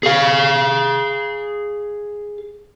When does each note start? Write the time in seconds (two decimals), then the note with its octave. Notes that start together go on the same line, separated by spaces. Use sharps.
0.03 G#4 F5